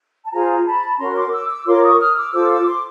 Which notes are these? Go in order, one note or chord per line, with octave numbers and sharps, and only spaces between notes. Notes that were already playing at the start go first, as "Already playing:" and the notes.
A5
F4 G#4 C5 G#5 A#5
A5 B5
C#4 F#4 A#4 A#5 C6
C6 D6
D6 E6
D6 E6
F4 A#4 C#5 C6 D6
C#6 D#6
D#6 F6
D6 E6
F4 A4 C5 D6 E6
D6 E6
C6 D6